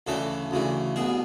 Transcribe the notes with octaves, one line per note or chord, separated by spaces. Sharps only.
D2 C#3 E3 A4
D2 C#3 E3
C2 B2 G#4